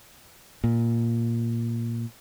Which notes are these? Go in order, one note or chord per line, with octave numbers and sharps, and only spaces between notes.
A#2